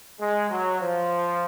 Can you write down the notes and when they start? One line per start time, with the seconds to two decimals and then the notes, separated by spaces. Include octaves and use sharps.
0.20 G#3
0.50 F#3
0.81 F3